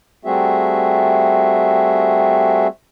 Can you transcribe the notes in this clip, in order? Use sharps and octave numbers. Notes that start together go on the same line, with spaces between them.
G3 A3 C4 F#4 G#4 E5